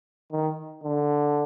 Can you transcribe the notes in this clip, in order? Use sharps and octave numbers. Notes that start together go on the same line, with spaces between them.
D#3
D3